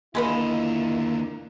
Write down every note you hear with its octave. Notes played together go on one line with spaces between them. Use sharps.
D#2 D3 G#3 A#3 B3 E4 F4 D#5